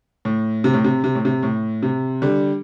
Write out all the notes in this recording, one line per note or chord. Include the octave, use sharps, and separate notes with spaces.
A2
C3
A2
C3
C3
A2
C3
A2
C3
D3 G3